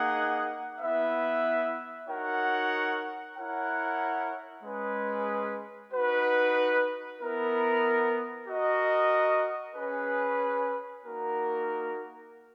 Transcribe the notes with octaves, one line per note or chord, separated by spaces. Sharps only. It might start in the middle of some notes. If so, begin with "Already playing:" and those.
Already playing: A#3 D#4 G#4 D#5 F#5
B3 E4 B4 E5
D#4 F#4 A#4 C#5 F#5
E4 A#4 C#5 F#5
G#3 C#4 G#4 B4
D#4 F#4 B4
B3 E4 A#4
F#4 A#4 D#5
C#4 G#4 B4
A#3 D#4 F#4 A#4